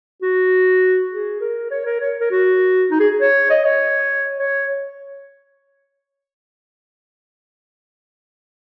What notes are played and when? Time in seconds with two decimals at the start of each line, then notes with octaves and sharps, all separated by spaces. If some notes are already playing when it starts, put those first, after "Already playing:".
0.22 F#4
1.12 G#4
1.41 A#4
1.71 C#5
1.85 A#4
2.00 C#5
2.20 A#4
2.31 F#4
2.91 D#4
3.00 G#4
3.21 C#5
3.50 D#5
3.64 C#5
4.39 C#5